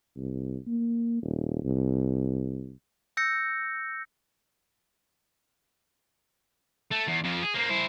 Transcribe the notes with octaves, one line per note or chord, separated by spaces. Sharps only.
C2
A#3
D#1
C2
E6 G6 A#6 C#7
A3
E2
F2 F3
G#4
A#3 C4
E4 C5